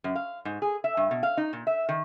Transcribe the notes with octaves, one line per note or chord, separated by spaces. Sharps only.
F#2
F5
G#2
G#4
E5
G2
B2
F5
D#4
A#2
E5
D#3